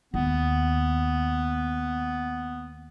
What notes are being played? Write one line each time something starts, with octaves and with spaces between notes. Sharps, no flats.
D#2 B3